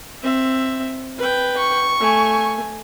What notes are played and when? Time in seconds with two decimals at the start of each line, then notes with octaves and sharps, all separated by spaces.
0.23 C4 E5
1.18 B4 G5
1.57 C#6
2.00 A3 G#5